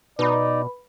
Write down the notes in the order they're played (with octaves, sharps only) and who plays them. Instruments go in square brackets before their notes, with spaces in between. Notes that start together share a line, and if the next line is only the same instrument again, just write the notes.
[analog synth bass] B2 [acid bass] D#4 [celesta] B4 B5 [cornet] D5